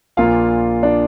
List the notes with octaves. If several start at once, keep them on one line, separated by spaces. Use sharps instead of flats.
A#1 A#2 A#3 F4 F5
D4 D5